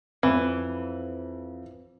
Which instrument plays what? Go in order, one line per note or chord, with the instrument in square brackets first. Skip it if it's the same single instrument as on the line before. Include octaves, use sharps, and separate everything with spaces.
[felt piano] F2 [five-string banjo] E3